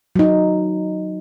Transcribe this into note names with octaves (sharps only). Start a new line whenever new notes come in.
F#3 D#4